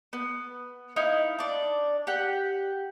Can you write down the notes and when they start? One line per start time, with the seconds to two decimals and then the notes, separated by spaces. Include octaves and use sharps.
0.13 B3
0.96 D#4 E4 F5
1.39 D4 D5
2.07 G4 F#5